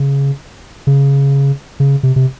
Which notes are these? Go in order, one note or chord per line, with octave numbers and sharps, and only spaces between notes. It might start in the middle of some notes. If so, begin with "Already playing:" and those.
Already playing: C#3
C#3
C#3
C3
C3